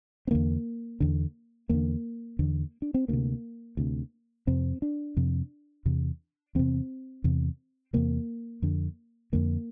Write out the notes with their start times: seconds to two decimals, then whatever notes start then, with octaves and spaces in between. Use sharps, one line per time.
0.27 C4
0.31 E2 D3 A#3
1.00 E2 D3
1.69 E2 D3 A#3
2.39 E2 D3
2.82 D4
2.94 C4
3.08 D2 C3 A#3
3.77 D2 C3
4.47 F2 C3 C4
4.82 D4
5.17 F2 C3
5.85 E2 C3
6.55 E2 C3 C4
7.24 E2 C3
7.93 E2 C3 A#3
8.62 F2 D3
9.33 F2 D3 A#3